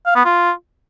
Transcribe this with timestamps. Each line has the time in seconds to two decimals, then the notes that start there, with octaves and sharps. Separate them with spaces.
0.06 F5
0.16 B3
0.25 F4